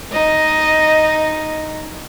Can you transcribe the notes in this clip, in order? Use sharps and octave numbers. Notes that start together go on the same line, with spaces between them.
D#4 D#5